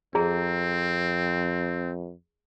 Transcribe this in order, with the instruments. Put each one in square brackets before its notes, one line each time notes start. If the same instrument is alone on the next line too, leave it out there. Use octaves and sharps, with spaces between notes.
[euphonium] F2 [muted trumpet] C4 [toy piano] G#4 A#5